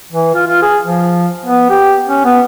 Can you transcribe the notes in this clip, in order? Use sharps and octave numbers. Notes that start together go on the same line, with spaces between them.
E3
F4
F4
G#4
F3
B3
G4
C#4
B3